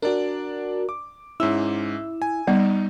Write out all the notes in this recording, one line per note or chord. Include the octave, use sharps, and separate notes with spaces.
D4 F#4 A#4 D5
D6
G#2 C#4 E4 E6
G#5
G3 B3 D#4